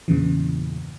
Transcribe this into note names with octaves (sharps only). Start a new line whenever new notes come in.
E2 G2 A#2 C#3 E3